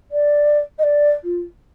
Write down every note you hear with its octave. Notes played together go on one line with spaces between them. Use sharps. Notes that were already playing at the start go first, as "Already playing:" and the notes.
D5
D#5
D5
F4